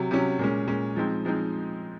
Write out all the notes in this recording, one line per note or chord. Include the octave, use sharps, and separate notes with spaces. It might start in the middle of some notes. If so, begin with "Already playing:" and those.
Already playing: C3 F#3
C3 F#3 C#4
A#2 G#3 C#4
A#2 G#3 C#4
F3 G#3 C4 D#4
F3 G#3 C4 D#4